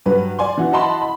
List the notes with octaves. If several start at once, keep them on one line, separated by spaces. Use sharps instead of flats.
G2 F#3 B4
D5 G#5 C6
E3 F#4
E4 F#4 D#5 A5 B5 C6
B5